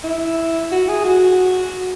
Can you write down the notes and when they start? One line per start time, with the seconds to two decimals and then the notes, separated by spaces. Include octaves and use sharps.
0.04 E4
0.72 F#4
0.89 G#4
1.05 F#4